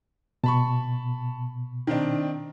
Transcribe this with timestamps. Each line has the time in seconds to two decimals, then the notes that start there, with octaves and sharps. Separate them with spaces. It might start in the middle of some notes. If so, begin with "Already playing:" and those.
0.44 B2 A5 B5 C#6
1.87 D#3 C4 D4